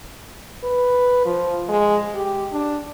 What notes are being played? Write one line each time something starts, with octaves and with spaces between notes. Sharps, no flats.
B4
F3
G#3
G4
D4